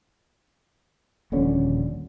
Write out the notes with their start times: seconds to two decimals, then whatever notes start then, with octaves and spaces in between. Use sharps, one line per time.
1.32 D#1 A#1 D3 C#4